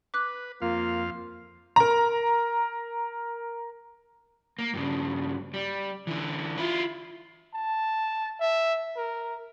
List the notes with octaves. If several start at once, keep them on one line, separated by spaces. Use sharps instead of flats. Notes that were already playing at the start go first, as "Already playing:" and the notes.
B4 D6 F#6
F2 A#3 F4 F5
A#4 A#5
A#3
G2 C#3
G3
D3 E3
E4 F4
A5
E5
A#4